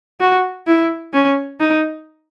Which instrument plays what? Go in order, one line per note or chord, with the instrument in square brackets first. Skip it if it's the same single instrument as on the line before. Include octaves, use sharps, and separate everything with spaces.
[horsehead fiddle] F#4
E4
C#4
D#4